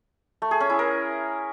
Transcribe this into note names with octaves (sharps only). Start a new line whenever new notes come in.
A3
G#4
C#4
E4
A#4